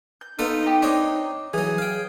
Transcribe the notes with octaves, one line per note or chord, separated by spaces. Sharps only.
G6
B3 D#4 F4 A4
G4 D#5
C4 D4 C#5 D#5 D6
E3 F#3 G#4
F5 G5